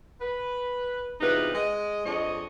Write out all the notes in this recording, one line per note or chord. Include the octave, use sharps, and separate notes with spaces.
B4
E2 C3 D4 D#4 F4 B4
G#3 D#5
F2 D4 G#4 C#5 D#5